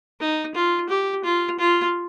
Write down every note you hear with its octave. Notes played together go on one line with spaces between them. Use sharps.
D#4
F4
G4
F4
F4